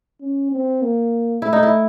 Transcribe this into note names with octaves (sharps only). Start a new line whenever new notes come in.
C#4
C4
A#3
A3 E4
D#4
E4